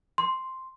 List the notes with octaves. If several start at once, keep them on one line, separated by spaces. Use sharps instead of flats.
C6